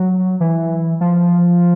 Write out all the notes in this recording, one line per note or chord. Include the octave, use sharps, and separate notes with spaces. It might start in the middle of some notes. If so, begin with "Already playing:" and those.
Already playing: F#3
E3
F3